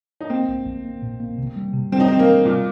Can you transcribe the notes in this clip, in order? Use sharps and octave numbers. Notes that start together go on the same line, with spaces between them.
D#4
A#3 C4
A#1
A#1
A#3
A#2
A#3
C3
G3
C3
G3 C4
D#4
G3 C4
A#3
C3
A#2 G3